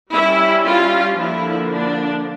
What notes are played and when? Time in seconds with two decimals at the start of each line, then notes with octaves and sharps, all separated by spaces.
0.13 G3 C#4 E4
0.66 F4
1.18 D3 F3 A#3 D4 E4
1.71 D4